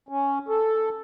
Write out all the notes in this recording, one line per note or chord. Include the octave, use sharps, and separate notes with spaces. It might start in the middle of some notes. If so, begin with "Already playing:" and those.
C#4
A4